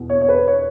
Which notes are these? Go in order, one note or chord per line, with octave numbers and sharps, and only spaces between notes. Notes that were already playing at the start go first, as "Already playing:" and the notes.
Already playing: E2 B2
C#5
C#5
B4
C#5